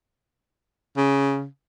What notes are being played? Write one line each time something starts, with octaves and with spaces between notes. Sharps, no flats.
C#3